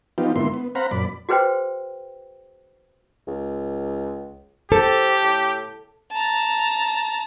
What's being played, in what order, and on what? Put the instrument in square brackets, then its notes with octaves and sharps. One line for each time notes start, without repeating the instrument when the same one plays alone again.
[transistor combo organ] F3 B3 D#4 F4 G4
G#2 D3 A#3 B3 E4 C6
B3
C4 C5 F5 F#5 A#5 B5
F#2 A#2 D5 B5
[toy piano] F#4 G#4 B4 C5 G5
[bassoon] C#2
[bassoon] C4 [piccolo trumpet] G4 [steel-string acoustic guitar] A4
[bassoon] A2
[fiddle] A5 A#5